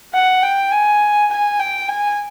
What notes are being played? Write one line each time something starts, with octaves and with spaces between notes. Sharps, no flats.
F#5
G5
G#5
G#5
G5
G#5